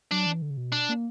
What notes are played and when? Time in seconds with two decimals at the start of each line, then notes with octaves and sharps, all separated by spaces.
0.11 F#3 D4
0.26 E3
0.42 D3
0.50 C#3
0.57 B2
0.72 D4
0.89 A#3